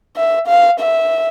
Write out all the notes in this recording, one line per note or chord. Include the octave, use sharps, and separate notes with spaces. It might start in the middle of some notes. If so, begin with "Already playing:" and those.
E5
F5
E5